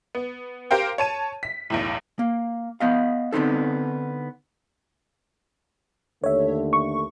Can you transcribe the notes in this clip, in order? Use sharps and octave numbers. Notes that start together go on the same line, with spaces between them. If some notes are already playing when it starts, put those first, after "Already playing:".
B3
G4 A#4 C5 F5 G5
C#5 A5 D#7
B6
B1 E2 A2
A#3
B3 D#5 F5
D3 B3 C4 D#4 A4
D#2 D3 A3 C#5 E5
C#6